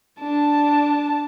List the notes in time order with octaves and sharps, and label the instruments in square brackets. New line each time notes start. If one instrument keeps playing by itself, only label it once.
[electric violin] D4 A5